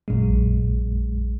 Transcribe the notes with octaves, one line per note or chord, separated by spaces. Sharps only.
A#1 F#2 A#2 G#3